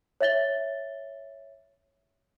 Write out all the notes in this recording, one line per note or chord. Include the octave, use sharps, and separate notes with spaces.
C#5 E5 A6 G7